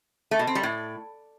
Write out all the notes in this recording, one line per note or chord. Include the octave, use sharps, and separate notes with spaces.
A3
B2
C4
G3
A2